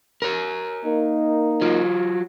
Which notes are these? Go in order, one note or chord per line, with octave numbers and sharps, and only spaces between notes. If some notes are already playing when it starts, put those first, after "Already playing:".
A#4 C#5
A#3 D#4
F#3 F4